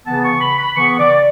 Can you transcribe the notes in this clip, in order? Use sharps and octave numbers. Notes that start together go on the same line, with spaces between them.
C#3 E3 B3 A5
C#6
B5
B5
C#3 E3 B3 C#6
D5